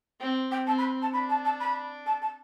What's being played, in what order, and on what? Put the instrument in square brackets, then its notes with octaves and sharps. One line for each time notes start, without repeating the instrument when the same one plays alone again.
[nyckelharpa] C4 [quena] G5
[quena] G5
[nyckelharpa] C4 [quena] A5
[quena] B5
A5
[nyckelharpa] D4 [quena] B5
[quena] A5
A5
B5
A5
A5